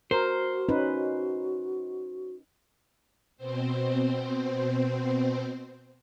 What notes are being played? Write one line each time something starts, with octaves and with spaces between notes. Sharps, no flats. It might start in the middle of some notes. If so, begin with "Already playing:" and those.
F#4 A#4 C5
C#4 D#4 B4
B2 C4 C5